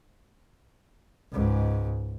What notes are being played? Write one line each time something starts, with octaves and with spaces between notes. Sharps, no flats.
C#2 G#2